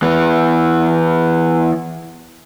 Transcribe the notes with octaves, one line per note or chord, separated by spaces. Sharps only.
E3 B3